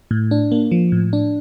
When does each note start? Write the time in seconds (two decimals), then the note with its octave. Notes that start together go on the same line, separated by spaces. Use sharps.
0.11 A2
0.31 D4
0.52 A#3
0.72 F3
0.92 A2
1.13 D4